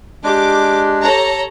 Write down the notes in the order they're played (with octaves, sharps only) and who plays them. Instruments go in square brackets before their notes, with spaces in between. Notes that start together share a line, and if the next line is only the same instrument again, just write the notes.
[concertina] G#3 D4 [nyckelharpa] G4 [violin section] D6
[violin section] A4 C#5 A#5